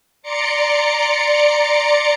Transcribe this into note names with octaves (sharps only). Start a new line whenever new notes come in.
D5 A#5 C6 D6 C#7